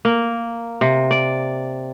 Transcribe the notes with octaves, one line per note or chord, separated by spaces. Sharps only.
A#3
C3
D5